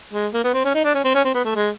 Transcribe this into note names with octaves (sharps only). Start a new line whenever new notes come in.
G#3
A#3
B3
C4
C#4
D#4
D4
C#4
C4
C#4
C4
B3
A3
G#3